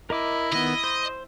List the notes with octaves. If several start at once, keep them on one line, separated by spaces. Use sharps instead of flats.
E4 A#4 D#5 D6
D#3 B3 D#5
C5